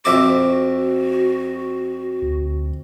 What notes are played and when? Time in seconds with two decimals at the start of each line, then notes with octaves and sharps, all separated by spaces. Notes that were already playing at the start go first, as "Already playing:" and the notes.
0.05 F2 F#4 E5 D6
2.22 D2